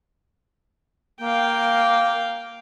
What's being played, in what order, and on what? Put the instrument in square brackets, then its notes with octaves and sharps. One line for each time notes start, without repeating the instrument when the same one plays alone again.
[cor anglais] A#3 [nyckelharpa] F5 G5